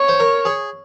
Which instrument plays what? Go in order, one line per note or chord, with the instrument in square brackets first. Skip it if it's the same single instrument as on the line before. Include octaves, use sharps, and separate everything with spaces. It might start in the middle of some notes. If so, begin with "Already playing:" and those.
Already playing: [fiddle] C#5
[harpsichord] C5
A#4
G#4